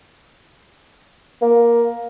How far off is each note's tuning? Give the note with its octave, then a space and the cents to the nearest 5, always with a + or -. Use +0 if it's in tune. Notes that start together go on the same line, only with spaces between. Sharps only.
A#3 +10